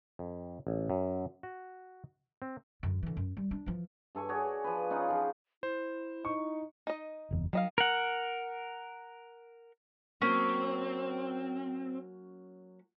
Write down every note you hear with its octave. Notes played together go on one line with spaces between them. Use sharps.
F2
A1
F#2
F#4
C4
F#2 D3
D3 E3
F#2
G3
D4
E3 F3
G2 A4 G#5 C#6
F#4 G#4 C#5 D5
F3 B4
C#4 D#4 F4 F#5
F3 G#4
E4 C5
D#4 C#6
D#4 D#5
F#1 E2
D#3 F#3 D#5 F5
A#4 F#5
F#3 A#3 C4 C#4